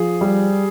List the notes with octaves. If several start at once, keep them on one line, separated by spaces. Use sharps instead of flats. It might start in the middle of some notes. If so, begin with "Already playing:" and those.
Already playing: F3 G#4
G3